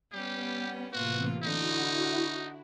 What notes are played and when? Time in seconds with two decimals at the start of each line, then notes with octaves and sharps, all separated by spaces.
0.12 G3 B3 C#4 G4
0.93 A2 C3 E3 A#3 F4 F#4
1.43 D3 D#4 E4 F#4